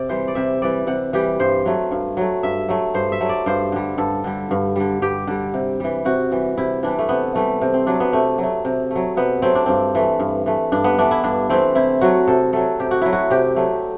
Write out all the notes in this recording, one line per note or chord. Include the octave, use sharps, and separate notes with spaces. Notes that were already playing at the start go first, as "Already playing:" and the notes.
Already playing: C3 D5
E3 G3 C5
D5
C3 E5
E3 G3 D5
C3 F#5
E3 G3 G4
G2 C5
F#3 A3
G2
F#3 A3
G2 E5
F#3 A3
G2 C5
E5
F#3 A3
D5
G2 C5
D3 G3
G2 A4
D3 G3
G2
D3 G3
G2 G4
D3 G3
C3
E3 G3
C3 F#4
E3 G3
C3 E4
E3 G3 D4
A3
C3 B3
E3 G3 A3
C3
C4
F#3 A3 D4
B3
C3 A3
F#3
A3
C3
F#3 A3
C3 B3
F#3 A3 C4
D4
G2 C4
E3 A3
G2
E3 A3
G2 D4
B3
E3 A3 D4
E4
G2 D4
E3 A3 C4
C3 E4
F#3 A3 F#4
C3 A4
F#3 A3 A4
C3 G4
F#4
F#3 A3 E4
F#4
C3 G4
F#3 A3